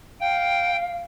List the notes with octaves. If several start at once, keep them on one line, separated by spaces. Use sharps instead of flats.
F5 G5